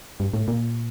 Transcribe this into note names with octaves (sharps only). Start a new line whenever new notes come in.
G2
A2
A#2